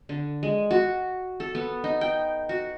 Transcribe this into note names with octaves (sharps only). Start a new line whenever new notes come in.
D3
G#3
F#4
A4
B3
D#4
G5
F#4